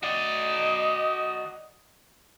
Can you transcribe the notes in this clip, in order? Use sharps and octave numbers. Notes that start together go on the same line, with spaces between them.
F#4 D5 D#5